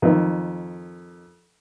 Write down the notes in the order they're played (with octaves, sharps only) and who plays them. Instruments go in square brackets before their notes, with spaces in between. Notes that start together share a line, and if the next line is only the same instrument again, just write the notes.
[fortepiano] F2 D#3